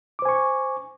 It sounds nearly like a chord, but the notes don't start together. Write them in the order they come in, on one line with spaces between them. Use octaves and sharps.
D6 C5 G#5 C#6